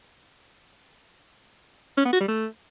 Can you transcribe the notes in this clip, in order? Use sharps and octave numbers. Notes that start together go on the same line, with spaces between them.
C#4
B3
F#4
G3
A3